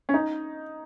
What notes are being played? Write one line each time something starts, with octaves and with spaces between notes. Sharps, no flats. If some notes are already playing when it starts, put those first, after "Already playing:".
C#4
D#4